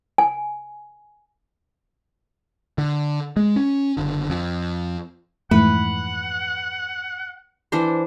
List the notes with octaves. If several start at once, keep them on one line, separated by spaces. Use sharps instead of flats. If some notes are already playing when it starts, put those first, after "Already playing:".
G#5
D3
G#3
C#4
F#1 D3
F2
F2 G#2 E3 A3 B4 F#5
E3 D4 C5